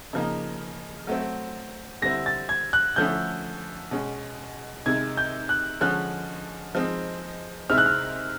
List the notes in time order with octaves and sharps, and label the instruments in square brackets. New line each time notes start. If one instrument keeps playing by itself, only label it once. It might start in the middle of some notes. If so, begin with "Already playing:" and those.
[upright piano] C#3 F3 A#3 D#4
F#3 A3 C4
[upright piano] D3 G3 C4 E4 [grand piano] A#6
[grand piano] A6
G#6
F#6
[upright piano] D3 F3 A3 C#4 E4 [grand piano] G6
[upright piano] B2 G#3 C#4
[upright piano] C3 D#3 G#3 [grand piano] G#6
[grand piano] G6
F#6
[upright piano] D3 F3 G#3 C#4 [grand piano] F#6
[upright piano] F3 G#3 C4 D#4
[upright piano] C3 D#3 G#3 C4 E4 [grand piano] F6
[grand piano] F#6
F6